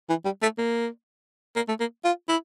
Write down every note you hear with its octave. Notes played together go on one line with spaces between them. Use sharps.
E3
G3
A3
A#3
A#3
A3
A#3
F4
E4